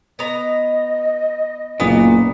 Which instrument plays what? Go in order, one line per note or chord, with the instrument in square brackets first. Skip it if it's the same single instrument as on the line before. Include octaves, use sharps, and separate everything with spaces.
[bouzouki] B3 A#5 [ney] D#5
[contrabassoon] F#1 [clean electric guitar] A#2 [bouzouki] B3